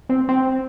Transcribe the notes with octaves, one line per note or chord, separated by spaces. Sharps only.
C4
C4